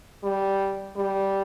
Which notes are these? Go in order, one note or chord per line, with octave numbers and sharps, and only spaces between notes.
G3
G3